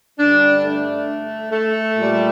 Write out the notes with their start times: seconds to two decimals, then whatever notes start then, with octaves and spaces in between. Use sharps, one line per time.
0.18 G2 D3 G3 D4
0.63 A3
1.51 A3
1.97 A#2 G3